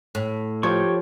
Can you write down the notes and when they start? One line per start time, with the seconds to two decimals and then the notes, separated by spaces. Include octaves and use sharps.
0.15 A2
0.63 F3 G4 C#5 C#6